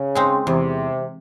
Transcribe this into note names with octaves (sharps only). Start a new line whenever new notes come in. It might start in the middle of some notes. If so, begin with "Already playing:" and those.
Already playing: C#3
G#3 C4 D#4
E2 C3